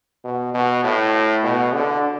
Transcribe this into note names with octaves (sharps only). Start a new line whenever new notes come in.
B2
B2
A2
B2
D3